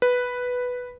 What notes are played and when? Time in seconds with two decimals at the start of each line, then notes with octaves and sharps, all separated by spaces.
0.02 B4